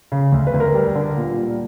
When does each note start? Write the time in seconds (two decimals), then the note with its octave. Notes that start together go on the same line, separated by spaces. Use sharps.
0.12 C#3
0.32 D2
0.47 B4
0.54 D2
0.60 A#4
0.74 G3
0.95 D3
1.17 A#2
1.37 G3